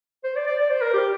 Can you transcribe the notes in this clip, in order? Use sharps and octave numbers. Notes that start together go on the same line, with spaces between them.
C5
D5
D5
D5
C5
A#4
G4